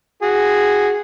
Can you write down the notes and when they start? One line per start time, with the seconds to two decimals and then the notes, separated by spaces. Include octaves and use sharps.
0.22 F#4 G#4